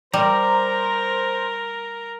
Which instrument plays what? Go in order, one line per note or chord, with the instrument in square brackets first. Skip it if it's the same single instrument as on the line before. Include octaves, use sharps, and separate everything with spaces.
[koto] G3 [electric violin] A#4 [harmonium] C5 [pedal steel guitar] A#5